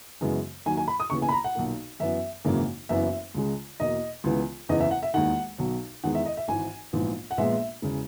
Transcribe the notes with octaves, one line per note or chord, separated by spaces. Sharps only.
F#2 C#3 E3 G#3 B3
D#2 D#3 F#3 G#5
G#5
B5
D#6
D#2 C#3 E3 B3 C#6
G#5
B5
A#5
F#5
B1 A#2 A#3
F#2 E3 B3 E5
G#1 F#2 C#3 E3 A#3
F#1 F#2 E3 B3 E5
C#2 C#3 G#3
E2 B2 A#3 D#5
C#2 C#3 E3 B3
F#1 E2 C#3 E3 B3 D#5
E5
F#5
E5
E1 D#2 D#3 F#5
B1 B2 F#3
E2 D#3 G#3 B3 F#5
E5
D#5
E5
G#1 G#2 E3 G#5
A#1 G#2 E3 B3
F#5
A#1 A#2 G#3 B3 E5
E1 C#3